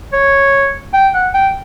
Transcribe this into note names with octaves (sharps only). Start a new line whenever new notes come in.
C#5
G5
F#5
G5